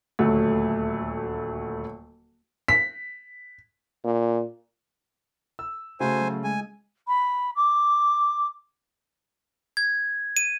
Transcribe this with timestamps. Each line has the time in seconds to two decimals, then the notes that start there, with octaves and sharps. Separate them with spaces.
0.19 D#1 D2 F#3 A3
2.68 B6
4.04 A#2
5.59 E6
6.00 C#3 A3 F#4 C5 G#5
6.21 F#3
6.44 G#3 G#5
7.07 B5
7.56 D6
9.77 G#6
10.37 D#7